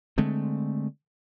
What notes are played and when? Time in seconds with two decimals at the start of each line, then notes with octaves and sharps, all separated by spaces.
0.18 D3 G#3 A3 C4